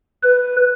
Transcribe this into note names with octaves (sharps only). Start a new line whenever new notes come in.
B4